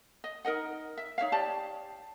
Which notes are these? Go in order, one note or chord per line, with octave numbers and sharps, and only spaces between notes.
D#5
D#4 A#4 D#5 F#5
E5
D#4 C#5 E5 F5
G4 C#5 D5 A5